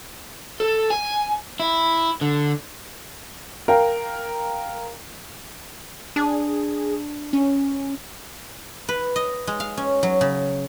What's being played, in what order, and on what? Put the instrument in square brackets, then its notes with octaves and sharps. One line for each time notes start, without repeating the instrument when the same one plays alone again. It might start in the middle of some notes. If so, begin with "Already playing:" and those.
[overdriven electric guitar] A4
G#5
E4
D3
[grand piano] A#4 F5 G5
[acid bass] D4 [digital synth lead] G#4
[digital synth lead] C#4
[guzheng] B4
D#5
G#3
F5
C#4
F#3
C#3